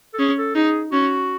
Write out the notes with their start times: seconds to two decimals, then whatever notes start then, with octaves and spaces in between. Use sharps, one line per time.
0.13 A4
0.19 C#4 G#4
0.38 A4
0.55 D#4 G#4
0.92 C#4 F#4